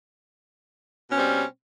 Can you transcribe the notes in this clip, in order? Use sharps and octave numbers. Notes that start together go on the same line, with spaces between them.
B2 G3 C4 C#4